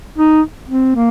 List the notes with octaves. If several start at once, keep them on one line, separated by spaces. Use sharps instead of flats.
D#4
C4
A#3